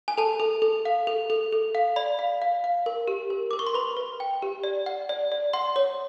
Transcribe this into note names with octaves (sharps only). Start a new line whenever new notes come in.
G#5
A4 A5
A4
A4
F5
A4
A4
A4
F5
D5 B5
F5
F5
F5
A#4
G4
A#4
A#4 D6
C#6
C6
B4 B5
B4
G5
G4
D5
F#5
D5
D5
F#5 C6
C#5